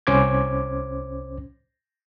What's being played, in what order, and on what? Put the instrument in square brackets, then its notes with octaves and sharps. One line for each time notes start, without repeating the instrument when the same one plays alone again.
[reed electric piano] C2 C#4 C5 D6 G#6